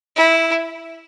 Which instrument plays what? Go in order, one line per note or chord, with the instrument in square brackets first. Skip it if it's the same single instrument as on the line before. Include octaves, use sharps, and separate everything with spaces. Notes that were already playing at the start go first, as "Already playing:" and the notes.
[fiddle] E4